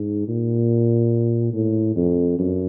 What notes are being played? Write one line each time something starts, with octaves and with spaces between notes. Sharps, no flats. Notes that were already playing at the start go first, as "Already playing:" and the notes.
Already playing: G#2
A#2
A2
F2
F#2